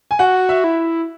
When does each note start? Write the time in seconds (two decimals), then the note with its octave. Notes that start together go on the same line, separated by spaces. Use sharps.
0.11 G#5
0.19 F#4 F#5
0.49 E5
0.64 E4